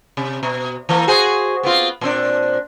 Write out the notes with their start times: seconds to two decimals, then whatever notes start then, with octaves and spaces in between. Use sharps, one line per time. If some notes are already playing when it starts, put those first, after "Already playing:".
0.17 C3
0.43 B2
0.89 E3 A#3
1.07 F#4 G#4 C5
1.63 B3 C4 F4
2.01 A#2 C4 D4